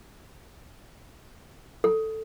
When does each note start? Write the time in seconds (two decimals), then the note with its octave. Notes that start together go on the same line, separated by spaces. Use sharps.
1.84 A4